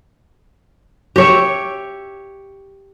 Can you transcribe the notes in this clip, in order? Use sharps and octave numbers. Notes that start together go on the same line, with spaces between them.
G4 C#5 E5